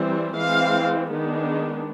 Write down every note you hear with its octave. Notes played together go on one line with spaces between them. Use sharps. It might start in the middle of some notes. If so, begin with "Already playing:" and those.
Already playing: E3 G3 C4
E3 G#3 C4 F5
D#3 G#3 B3 D4